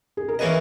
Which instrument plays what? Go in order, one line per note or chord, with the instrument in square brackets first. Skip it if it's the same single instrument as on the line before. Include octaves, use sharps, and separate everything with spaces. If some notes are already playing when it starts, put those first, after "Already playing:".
[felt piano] G#4
A#4
[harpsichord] E3 A#3 C#4 G#4 D#5 [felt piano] B4